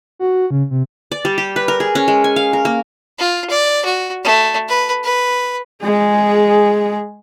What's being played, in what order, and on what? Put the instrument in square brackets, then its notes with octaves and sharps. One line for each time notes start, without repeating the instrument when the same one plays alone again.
[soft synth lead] F#4
C#3
C3
[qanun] D5
G3
G4
B4
A#4
G#4
C#4
G#3
G#5
F5
A#4
A#3
[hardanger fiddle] F4
D5
F#4
A3
B4
B4
[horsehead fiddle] G#3 G#4